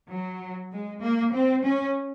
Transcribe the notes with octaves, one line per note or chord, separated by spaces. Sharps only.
F#3
G#3
A#3
C4
C#4